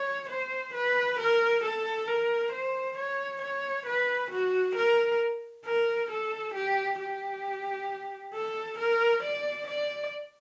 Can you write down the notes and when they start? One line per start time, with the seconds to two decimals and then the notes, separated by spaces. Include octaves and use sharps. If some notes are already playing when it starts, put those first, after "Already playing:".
Already playing: C#5
0.30 C5
0.74 B4
1.19 A#4
1.64 A4
2.07 A#4
2.53 C5
2.98 C#5
3.42 C#5
3.86 B4
4.31 F#4
4.76 A#4
5.66 A#4
6.11 A4
6.54 G4
7.00 G4
8.34 A4
8.79 A#4
9.23 D5
9.67 D5